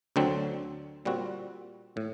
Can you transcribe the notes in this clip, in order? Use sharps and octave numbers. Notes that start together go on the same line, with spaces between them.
D2 D3 F#3 C4
A#2 G3 C4 F#4
A2